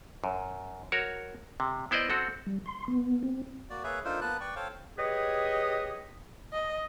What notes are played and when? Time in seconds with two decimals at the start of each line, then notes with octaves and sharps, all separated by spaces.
0.24 F#2
0.92 F#4 A#4 C#5
1.60 C3
1.91 B3 E4 C5 D5 D#5
2.10 C4 F#4 A4
2.47 G3
2.66 C6
2.88 B3
3.23 C4
3.70 A#3 F#4 D5
3.84 A#3 G#4 B4 C#5 E5
4.05 D4 D#4 F4 A4 A#4 C5
4.21 A#3 B3 B4 A5 F#6
4.40 B4 D5 G5 C#6
4.56 A4 C5 C#5 F5 G5
4.97 G4 G#4 B4 C#5 D#5
6.53 D#5